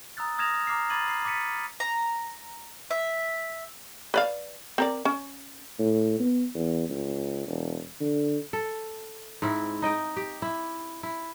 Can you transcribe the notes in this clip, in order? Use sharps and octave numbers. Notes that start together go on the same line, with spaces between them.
A#5 D#6 E6 F#6 A6
D#6 F6 G#6 A#6 E7 F7
A#5 D6 F6 C7
B5 D6 G#6 A6 D#7 F#7
A#5 C7
D6 A6 B6 C#7 D#7
A#5
E5
B4 D5 F5
C4 A#4 D5
C#4
A2
B3
E2
C#2
E1
D3
A4
G#2 C4 E4
D#4 D#5 G5
G4
E4
E4